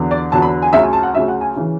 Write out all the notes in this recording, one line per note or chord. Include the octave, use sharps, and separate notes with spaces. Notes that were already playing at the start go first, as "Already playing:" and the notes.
Already playing: E2 D3 F#3
D5
E2 D3 F#3 A5
B5
G#5
D2 C#3 F#3 E5
G#5
A5
F#5
D2 C#3 F#3 E5
F#5
G#5
C#3 E3